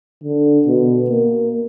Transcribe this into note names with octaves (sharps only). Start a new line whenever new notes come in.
D3
B2
A#3